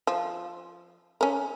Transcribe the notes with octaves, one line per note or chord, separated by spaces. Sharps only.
F3
C#4 A#4